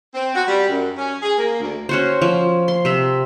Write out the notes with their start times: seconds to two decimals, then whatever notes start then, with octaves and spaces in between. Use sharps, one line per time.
0.15 C4
0.35 F#4
0.48 G3
0.69 F#2
0.98 C#4
1.22 G#4
1.38 A#3
1.60 D2
1.89 C#4 F#4 C5
2.22 F3
2.68 C6
2.85 C3 E5